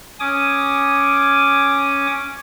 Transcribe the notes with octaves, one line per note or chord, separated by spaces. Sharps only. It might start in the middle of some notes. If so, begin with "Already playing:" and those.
C#4 G#5 D6 D#6